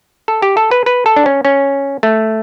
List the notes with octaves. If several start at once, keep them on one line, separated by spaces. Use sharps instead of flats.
A4
G4
A4
B4
B4
A4
D4
C#4
C#4
A3